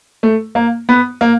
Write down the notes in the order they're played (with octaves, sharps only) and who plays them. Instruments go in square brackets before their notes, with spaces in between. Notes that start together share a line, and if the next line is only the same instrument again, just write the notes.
[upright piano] A3
A#3
B3
A#3